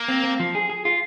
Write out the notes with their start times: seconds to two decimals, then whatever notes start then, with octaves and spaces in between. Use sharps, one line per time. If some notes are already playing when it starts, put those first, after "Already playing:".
Already playing: A#3
0.08 C4
0.24 C4
0.40 F3
0.55 G#4
0.70 G#4
0.85 F4